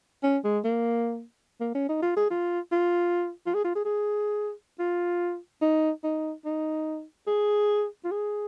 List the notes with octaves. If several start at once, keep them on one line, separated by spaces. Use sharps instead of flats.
C#4
G#3
A#3
A#3
C#4
D#4
F4
G#4
F4
F4
F4
G#4
F4
G#4
G#4
F4
D#4
D#4
D#4
G#4
F4
G#4